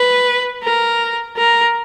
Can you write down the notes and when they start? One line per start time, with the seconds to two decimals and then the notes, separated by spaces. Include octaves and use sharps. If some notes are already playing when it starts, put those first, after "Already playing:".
Already playing: B4
0.63 A#4
1.37 A#4